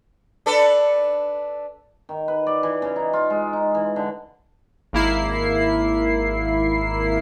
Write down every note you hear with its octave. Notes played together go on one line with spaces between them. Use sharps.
D4 A4 B4
D#3
B4
D5
E3
C#3
D#4
F4
G#3
D#4
E3
D3
G#1 A#3 E4 C7